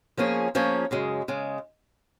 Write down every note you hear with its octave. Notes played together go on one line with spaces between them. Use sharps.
F3 A#3 C#4 G#4 C#5
F3 A#3 C#4 G#4 C#5
F#2 C#3 G#3
C#3 G#3